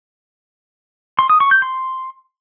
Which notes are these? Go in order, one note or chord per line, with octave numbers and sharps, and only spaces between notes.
C6
D#6
C#6
G6
C6